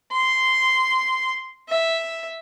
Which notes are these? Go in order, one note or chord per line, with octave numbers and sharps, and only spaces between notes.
C6
E5